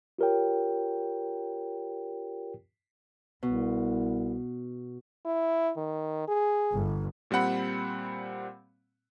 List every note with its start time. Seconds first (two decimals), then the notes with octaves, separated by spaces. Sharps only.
0.18 F4 G4 A#4 C#5 G5
3.43 C2 B2
5.25 E4
5.77 D#3
6.28 G#4
6.72 G1
7.31 A#2 G3 C4 F#5 B5